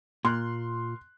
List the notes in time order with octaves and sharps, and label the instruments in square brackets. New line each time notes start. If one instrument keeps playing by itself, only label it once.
[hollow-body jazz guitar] A#2 [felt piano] C6 F6 F#6